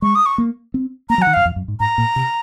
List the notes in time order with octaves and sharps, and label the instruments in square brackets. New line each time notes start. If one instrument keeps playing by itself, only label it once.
[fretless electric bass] G#3 [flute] C#6
[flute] D#6
C#6
[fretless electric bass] A#3
C4
[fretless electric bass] A#3 [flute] A#5
[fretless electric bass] F#3
[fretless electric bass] D#3 [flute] F#5
[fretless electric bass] F#2 [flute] F5
[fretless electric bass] F2
F#2
G#2
[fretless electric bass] G#2 [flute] A#5
[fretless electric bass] A#2
C3